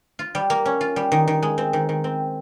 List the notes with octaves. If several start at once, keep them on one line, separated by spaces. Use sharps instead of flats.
F4
G3
A#3
C#4
F4
G3
D#3
D#3
G#3
C4
D#3
D#3
C4